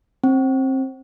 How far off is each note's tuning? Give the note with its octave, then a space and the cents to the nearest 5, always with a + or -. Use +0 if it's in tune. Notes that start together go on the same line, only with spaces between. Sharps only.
C4 +25